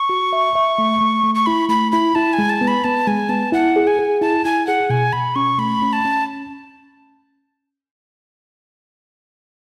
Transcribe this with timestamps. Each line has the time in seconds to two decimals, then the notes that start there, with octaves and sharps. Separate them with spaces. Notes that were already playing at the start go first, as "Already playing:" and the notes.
Already playing: C#6
0.09 F#4
0.33 E5
0.55 E5
0.78 A3
1.01 A3
1.23 A3
1.35 C#6
1.46 E4 B5
1.69 A3 B5
1.92 E4 B5
2.15 E4 A5
2.33 G#5
2.38 G#3
2.49 A5
2.61 B3
2.67 B5
2.84 B3 A5
3.07 G#3 G#5
3.29 B3 A5
3.52 E4 F#5
3.76 G#4
3.87 G#5
3.99 G#4
4.21 E4 A5
4.45 E4 G#5
4.67 G#4 F#5
4.90 B2 G#5
5.12 B2 B5
5.35 C#4 C#6
5.58 A3 B5
5.82 C#4
5.93 A5
6.05 C#4